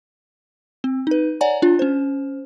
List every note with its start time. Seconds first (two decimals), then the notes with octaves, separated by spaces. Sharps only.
0.84 C4
1.07 D#4 B4
1.41 C#5 D5 F#5 G#5 A#5
1.62 D4 F4
1.79 C#4 C5